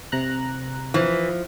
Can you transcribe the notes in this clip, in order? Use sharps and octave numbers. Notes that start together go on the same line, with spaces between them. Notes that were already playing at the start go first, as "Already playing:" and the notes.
C3 A#5 F#6
E3 F3